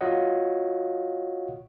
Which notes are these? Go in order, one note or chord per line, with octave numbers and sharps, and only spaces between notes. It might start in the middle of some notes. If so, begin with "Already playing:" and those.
F4 F#4 C#5 D#5 F5 F#5